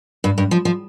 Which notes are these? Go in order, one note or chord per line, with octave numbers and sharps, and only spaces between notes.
G2
G2
F3
F3